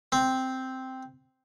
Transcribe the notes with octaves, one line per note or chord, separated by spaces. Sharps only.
C4